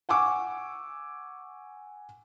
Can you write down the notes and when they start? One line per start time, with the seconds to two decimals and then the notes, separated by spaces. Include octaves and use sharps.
0.09 F#5 G#5 C#6 D6 E6